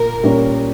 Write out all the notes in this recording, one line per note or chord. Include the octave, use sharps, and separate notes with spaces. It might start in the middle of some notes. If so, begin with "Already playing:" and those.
Already playing: A#2 A#4
A#2 G3 C#4